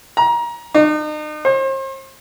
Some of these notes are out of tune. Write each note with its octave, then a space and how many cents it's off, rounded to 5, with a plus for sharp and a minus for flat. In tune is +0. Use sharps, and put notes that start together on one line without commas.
A#5 +25
D#4 -40
C5 +40